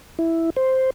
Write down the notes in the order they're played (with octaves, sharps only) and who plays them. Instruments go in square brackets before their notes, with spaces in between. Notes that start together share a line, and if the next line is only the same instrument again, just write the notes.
[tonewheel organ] E4
C5